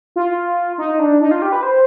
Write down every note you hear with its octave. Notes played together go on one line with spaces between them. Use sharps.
F4
D#4
D4
D#4
F4
G4
B4
C5